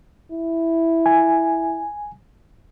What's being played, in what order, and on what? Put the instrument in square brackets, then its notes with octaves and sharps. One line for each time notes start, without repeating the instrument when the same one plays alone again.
[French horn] E4
[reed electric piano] G#5